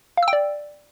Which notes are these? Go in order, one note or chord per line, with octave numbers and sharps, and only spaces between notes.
F5
E6
G5
D5